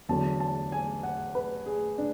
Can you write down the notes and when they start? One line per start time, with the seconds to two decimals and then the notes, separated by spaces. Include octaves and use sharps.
0.09 E2 D3 F#3 A5
0.40 A5
0.72 G#5
1.03 F#5
1.35 B4
1.66 G#4
1.98 D4